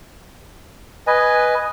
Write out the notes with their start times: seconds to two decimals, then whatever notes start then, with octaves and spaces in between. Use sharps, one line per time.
1.07 B4 D#5 G#5